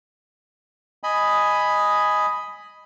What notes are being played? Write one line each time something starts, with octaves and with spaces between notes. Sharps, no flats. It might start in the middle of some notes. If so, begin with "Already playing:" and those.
D#5 G#5 B5